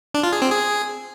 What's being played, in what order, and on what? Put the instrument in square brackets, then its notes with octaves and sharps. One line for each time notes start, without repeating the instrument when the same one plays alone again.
[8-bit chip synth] D4
F4
G#4
C4
G#4